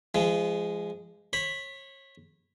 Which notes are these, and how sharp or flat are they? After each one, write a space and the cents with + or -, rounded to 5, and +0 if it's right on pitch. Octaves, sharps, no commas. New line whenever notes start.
F3 -35 G#3 -10
C#5 -30 B5 +0